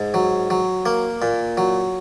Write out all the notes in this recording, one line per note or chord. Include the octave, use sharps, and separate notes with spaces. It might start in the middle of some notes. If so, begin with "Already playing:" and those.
Already playing: G#2
F#3
F#3
A#3
A#2
F#3